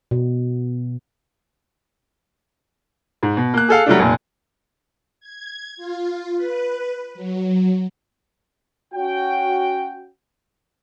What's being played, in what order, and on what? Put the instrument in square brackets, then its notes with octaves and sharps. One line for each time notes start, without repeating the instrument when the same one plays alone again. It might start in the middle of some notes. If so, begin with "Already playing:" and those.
[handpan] B2
[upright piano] G#2
B2
A#3 F#6
G#4 A4 F5
F#3 G3 A3 D4
F1 A#2
[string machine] G#6
F4
B4
F#3
[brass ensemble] C#4 F#4 G5